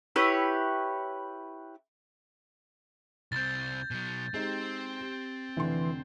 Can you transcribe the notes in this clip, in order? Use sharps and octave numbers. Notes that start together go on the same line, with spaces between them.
E4 G4 B4 C#5
C2 C4 G6 A6
B2 F#3
G#3 C4 D#4 G4
G4
F1 D3 E3 C6